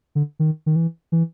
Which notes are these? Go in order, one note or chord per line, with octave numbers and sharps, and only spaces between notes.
D3
D#3
D#3
E3
E3